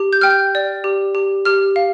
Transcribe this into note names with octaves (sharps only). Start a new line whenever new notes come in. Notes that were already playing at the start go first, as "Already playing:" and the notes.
Already playing: G4
G6
G5 F6
G6
D5
G4
G4
G4 F6
F5